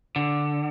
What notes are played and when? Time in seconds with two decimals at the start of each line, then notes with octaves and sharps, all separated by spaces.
0.16 D3